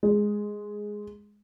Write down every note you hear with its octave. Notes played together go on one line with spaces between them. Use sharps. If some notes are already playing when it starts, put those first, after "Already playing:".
G#3